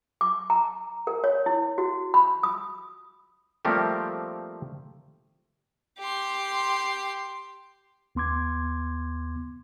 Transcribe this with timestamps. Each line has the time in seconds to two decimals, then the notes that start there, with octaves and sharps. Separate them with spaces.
0.21 D6
0.50 A#5
1.07 A#4
1.24 C#5
1.46 E4
1.78 F#4
2.14 B5
2.43 D#6
3.65 F3 G3 A3 A#3 C4 G4
5.99 G4 C6
8.15 D#2 B3 C6 D6 G#6